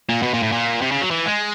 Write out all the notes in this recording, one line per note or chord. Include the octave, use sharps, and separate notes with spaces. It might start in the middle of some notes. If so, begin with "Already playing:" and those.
A#2
B2
A#2
A2
A#2
C3
C#3
F#3
E3
G#3